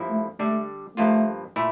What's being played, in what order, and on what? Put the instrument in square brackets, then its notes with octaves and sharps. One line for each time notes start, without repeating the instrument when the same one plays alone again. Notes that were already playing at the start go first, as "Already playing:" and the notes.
Already playing: [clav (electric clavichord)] G2 F3 A#3 E4
[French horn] A3
[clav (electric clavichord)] D3 G3 D4 [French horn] A3
[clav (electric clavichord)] G2 F3 A#3 F4 [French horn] A3
[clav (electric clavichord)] A#2 A3 E4